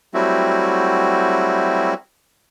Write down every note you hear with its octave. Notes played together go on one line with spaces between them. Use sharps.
F#3 G3 A3 C4 E4 F#4